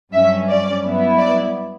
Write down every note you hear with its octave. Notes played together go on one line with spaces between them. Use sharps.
G2 F#3 C#4 E5
D5
G2 F#3 B3 E4
D5